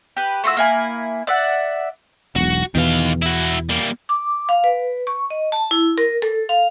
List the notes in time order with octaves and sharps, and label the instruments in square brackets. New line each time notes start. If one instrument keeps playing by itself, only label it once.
[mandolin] G4 B4
A3 F4 F#4 E6
A#3 E4 G#5
D5 E5 F#5
[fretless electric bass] E1 B1 [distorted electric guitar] F#4
[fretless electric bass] E2 B2 E3 [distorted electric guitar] D#3 F5
[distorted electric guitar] E4 F#4
G3 A#3
[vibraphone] D6
F5
B4
C#6
D#5
A5
E4
A#4
A4
F5